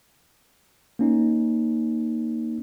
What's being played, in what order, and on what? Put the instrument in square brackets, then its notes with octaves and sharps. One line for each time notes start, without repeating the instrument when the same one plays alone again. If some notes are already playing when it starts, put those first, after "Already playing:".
[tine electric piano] A#3 C#4 D#4